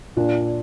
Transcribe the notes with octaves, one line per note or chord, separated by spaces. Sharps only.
A#2 D4